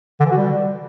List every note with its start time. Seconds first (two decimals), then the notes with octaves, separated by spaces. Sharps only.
0.20 D3
0.26 E3
0.32 F#4
0.37 G3